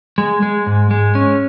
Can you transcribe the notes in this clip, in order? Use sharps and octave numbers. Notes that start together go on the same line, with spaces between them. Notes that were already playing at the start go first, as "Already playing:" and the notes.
G#3
G#3
G#2
G#3
C#4